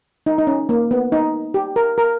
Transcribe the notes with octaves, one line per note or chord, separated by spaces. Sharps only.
D#4
D#4
C#4
A#3
B3
D#4
G4
A#4
A#4